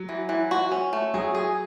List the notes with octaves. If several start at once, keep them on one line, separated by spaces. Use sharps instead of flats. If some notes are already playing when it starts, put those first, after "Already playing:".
Already playing: F#3
E3
E3
F#4
C#4
A3
F#3 G#4
G#4